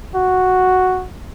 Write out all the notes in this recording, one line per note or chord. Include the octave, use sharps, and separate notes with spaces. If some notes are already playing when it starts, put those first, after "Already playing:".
F#4